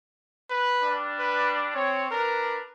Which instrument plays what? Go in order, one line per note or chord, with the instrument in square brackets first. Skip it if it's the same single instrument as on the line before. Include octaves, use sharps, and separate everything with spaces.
[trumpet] B4
[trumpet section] G3 D4
[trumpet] B4
[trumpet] C4 [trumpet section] C#5
[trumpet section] D4 B4 [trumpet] A#4